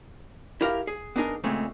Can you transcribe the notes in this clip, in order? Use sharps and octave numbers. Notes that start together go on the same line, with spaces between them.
E4 G4 A#4 F5
G#4
B3 D4 D#4 G#4 A#4
A#2 C#3 G#3 A3 C4